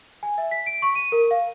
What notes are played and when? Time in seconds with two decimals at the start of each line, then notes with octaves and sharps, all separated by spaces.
0.23 G#5
0.38 E5
0.51 B6
0.66 D7
0.82 C#6
0.95 D#7
1.12 A#4
1.31 F5